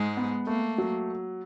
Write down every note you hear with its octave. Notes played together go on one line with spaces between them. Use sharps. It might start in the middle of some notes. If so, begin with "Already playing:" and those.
Already playing: G#2 G#3
B3
A3 A#3
F#3